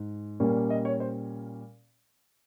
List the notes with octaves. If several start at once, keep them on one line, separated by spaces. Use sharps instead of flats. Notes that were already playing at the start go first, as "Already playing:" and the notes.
Already playing: G#2
A#2 G3 A#3 C#4
D#5
C#5
C5